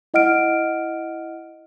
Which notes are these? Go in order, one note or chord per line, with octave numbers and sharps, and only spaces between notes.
E4 D#5 F#5 F6 D7